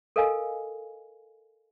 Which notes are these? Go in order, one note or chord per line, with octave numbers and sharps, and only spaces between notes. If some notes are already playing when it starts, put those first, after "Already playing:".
A4 A#4 D#5 F5 G#5